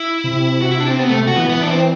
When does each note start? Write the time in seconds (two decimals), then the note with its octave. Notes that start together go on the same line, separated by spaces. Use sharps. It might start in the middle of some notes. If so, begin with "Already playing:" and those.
Already playing: E4
0.24 C3
0.62 F#4
0.71 E4
0.80 D4
0.90 C4
0.99 B3
1.09 A3
1.27 F#4
1.36 E3 B3
1.49 B3
1.62 D4
1.71 C4